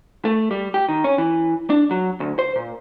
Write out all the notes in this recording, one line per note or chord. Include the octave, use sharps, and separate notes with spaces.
A3
G3
G4
D#3
C#4
E3
D4
F#3
D2
C5
A#2